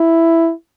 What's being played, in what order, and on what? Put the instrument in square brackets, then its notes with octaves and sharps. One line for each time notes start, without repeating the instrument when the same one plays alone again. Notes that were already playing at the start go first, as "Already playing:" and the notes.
Already playing: [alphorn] E4